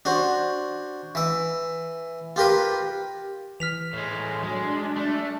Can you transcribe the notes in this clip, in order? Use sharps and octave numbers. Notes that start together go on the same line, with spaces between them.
D4 F#4 C5
E3 E5
F4 G4 A#4 B4
E3 F6 B6 F7
A2 G#3
F#3 G#3 D4
A3